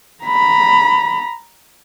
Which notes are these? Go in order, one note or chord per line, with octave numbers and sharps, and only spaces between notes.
A#5 B5